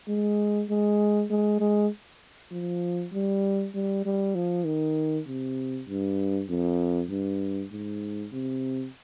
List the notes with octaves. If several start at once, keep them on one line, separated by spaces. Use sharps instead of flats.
G#3
G#3
G#3
G#3
F3
G3
G3
G3
F3
D#3
C3
G2
F2
G2
G#2
C3